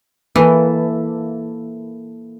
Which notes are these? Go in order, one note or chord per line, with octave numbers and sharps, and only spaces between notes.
E3 A#3 E4 A4